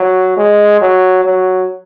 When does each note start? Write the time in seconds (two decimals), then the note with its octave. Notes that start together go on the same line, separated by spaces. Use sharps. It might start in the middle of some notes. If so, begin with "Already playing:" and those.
Already playing: F#3
0.37 G#3
0.81 F#3
1.25 F#3